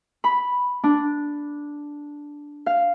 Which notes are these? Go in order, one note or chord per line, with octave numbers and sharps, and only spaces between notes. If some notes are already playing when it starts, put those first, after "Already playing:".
B5
D4
F5